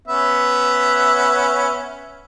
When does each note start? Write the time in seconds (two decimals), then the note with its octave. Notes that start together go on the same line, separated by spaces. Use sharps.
0.08 B3 C#4 E5